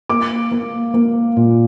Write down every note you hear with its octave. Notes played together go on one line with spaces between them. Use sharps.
A#3 D6
A#3
A#3
A#2